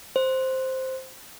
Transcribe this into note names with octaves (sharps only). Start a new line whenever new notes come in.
C5